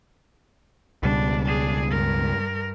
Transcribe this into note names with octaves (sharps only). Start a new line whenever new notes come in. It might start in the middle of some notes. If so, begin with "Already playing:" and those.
C#2 B2 G3 D4
D4 G#4
G2 A#4